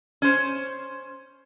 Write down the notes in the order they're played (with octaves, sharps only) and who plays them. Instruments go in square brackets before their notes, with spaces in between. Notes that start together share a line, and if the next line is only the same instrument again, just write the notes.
[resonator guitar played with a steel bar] C#4 C5